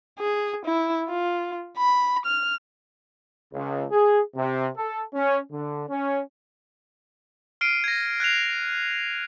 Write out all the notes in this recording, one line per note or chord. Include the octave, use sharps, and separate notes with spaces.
G#4
E4
F4
B5
F6
C#2
G#4
C3
A4
C#4
D3
C#4
F6 C7 D7 D#7
G#6 A#6
F#6 G#6 C7 F7